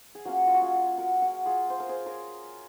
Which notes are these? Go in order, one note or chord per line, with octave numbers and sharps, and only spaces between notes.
G#4
F#3 A#3 C#4 F4 F#4
F4
F#4
F4 G#4
F#4 A#4
F#4 A#4
F4 G#4
C5
A#4
G#4 C5
A#4 C#5